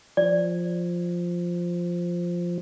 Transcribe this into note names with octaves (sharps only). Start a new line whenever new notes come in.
F3 D5